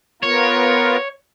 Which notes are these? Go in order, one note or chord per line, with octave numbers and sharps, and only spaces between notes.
B3 F4 A#4 C#5